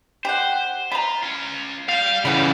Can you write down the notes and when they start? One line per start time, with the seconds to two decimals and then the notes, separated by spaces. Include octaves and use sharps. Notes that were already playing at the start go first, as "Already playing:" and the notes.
0.25 G4 C5 F#5
0.92 F4 A#5 B5
1.22 C#4 F4
1.89 G3 F5 G5
2.25 C#3 E3 F#5 B5